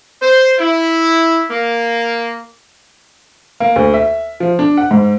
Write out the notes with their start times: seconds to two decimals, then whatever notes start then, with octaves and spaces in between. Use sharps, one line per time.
0.22 C5
0.60 E4
1.50 A#3
3.60 A#3
3.76 D2
3.94 E5
4.40 F3
4.59 D4
4.77 F#5
4.91 G#2